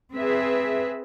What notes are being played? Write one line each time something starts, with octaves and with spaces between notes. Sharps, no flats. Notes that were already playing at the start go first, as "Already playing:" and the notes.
C4 G#4 B4 E5